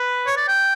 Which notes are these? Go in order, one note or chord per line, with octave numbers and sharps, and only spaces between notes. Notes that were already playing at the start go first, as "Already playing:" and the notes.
Already playing: B4
C#5
D5
G5